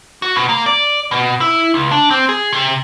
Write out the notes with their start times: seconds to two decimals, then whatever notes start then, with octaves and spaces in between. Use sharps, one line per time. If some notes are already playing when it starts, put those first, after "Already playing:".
0.22 F#4
0.36 B2
0.49 A#3
0.66 D5
1.11 B2
1.41 E4
1.74 C#2
1.91 D4
2.11 C4
2.29 G#4
2.53 C3